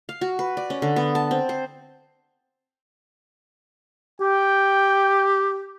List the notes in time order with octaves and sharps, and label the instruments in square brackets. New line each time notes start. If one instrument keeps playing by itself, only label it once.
[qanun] F5
F#4
B4
D5
C#4
D3
B3
A5
C4
C5
[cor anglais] G4 [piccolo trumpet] G5